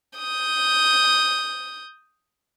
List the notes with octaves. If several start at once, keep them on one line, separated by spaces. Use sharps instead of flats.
D#6 G6